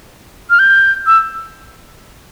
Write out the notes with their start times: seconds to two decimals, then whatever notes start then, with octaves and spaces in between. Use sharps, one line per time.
0.50 F6
0.59 G6
1.07 E6